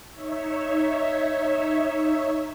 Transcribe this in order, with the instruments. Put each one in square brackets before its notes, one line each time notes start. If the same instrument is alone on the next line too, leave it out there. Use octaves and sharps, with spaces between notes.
[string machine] D#4 C#5 E5